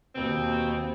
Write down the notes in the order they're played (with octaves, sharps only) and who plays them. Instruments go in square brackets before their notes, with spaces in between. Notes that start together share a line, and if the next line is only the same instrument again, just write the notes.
[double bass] D#2 [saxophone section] B2 C4